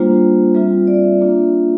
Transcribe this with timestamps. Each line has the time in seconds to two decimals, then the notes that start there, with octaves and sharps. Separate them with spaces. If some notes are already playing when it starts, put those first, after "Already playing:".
Already playing: G3 A#3 D4 F4 C5
0.55 G3 C4 F4 E5
0.87 D5
1.04 E5
1.21 A#3 D4 F4